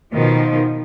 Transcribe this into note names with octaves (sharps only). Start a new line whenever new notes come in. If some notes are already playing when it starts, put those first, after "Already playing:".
B2 D#3 F3